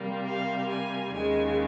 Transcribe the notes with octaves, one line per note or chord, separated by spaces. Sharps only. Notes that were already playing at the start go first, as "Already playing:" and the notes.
Already playing: C3 G3 A#3
F5
G#5
D#2 C#3 G#3 G#5